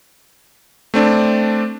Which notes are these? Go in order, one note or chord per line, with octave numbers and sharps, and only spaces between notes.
A3 C4 D4